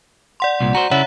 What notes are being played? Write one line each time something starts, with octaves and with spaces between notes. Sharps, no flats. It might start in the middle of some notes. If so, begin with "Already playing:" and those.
D5 F#5 C6
C2 A#2
F#4 C5 A#5
C#3 E4 C#5 E5 F#5